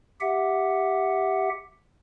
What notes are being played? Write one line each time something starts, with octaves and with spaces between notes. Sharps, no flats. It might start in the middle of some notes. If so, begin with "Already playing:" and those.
G4 E5 F#5